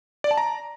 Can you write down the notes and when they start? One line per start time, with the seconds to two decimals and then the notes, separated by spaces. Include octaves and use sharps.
0.24 D5
0.31 A5
0.37 A#5